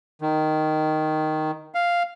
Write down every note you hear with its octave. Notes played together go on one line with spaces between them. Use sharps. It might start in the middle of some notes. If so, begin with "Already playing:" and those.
D#3
F5